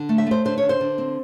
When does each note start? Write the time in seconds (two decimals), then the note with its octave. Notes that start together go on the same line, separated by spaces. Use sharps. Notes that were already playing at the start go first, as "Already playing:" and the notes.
Already playing: D3
0.09 A3
0.18 E5
0.27 A3 C5
0.45 D3 C5
0.58 D3 C#5
0.69 C5
0.80 D3
0.98 C4